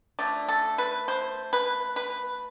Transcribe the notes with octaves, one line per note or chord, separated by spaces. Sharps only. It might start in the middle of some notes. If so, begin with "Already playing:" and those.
D3 F3 A3 D5
A4
B4
C5
B4
B4